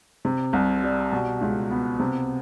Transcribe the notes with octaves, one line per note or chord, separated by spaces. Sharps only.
C3
C2
G3
B2
C#2
B3
C3